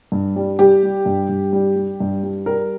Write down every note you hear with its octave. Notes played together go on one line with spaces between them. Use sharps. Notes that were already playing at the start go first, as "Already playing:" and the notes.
G2
G3
G3 G4
G3
G2
G2
G3
G3
G2
G3
G3 A#4